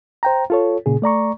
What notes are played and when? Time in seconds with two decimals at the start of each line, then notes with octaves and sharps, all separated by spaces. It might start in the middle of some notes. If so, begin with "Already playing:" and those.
0.23 C5 G5 A#5
0.50 F4 A4 C#5
0.86 A#2 C#3 G#4
1.02 A3 D5 A#5 C#6